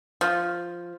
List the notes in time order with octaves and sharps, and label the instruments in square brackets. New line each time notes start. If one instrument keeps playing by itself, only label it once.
[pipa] F3